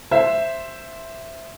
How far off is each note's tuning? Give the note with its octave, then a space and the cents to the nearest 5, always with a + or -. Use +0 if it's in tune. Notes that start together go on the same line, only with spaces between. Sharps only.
C5 +0 E5 +5